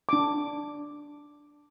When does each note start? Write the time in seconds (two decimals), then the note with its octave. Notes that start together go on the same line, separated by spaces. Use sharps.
0.09 D4 D6